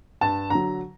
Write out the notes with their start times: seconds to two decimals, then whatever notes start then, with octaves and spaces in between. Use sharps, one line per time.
0.21 G2 A5
0.50 D3 F#3 A#5